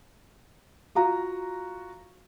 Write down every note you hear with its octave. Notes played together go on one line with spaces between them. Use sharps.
F4 F#4 A#5